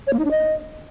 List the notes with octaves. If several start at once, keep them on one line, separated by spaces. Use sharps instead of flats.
C#5
A#3
D#4
D4
D#5